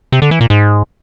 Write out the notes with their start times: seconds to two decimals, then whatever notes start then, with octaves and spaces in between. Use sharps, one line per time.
0.12 C3
0.22 D3
0.31 E3
0.41 A#2
0.50 G#2